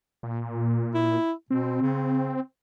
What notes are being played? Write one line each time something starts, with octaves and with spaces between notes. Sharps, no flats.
A#2
E4
B2 C4
C#3